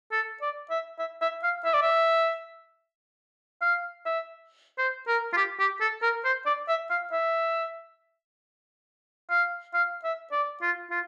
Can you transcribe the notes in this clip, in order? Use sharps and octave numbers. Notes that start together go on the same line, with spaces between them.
A4
D5
E5
E5
E5
F5
E5
D5
E5
F5
E5
C5
A#4
F4
G4
G4
A4
A#4
C5
D5
E5
F5
E5
F5
F5
E5
D5
F4
F4